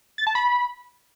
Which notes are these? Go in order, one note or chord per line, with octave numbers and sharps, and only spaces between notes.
A6
A5
B5